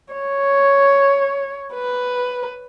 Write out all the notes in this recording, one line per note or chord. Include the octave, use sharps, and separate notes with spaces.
C#5
B4